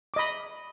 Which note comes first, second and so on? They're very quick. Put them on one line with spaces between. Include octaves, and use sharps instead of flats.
D6 D#5 B5